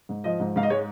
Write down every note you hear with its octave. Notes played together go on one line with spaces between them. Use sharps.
G#2
F3 D#5
G#2
G#2 F5
D#5
G#3 C#5